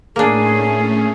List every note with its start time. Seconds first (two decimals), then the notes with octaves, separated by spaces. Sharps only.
0.16 A2 A3 A#3 C#4 D4 G#4